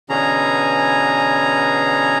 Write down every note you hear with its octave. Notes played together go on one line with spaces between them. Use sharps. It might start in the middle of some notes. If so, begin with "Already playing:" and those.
B2 D3 E3 C#4 G#4 A#5